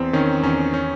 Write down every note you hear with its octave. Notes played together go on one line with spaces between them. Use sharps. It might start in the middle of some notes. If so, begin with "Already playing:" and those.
Already playing: E2 C4
D#3 C#4
E2 C#4
C#4